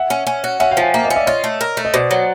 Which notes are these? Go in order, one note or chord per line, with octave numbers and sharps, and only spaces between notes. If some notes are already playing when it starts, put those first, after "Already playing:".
Already playing: E5 F#5
C#4
C#4
F#4
C#4 E5 F#5
F5 G5
F3
F#5 G#5
A#3 E5 F#5
D#5 F5
C#4
D5 E5
F4 C#5 D#5
A3
A#4
A3
D#5
B2 C5 D5
F#3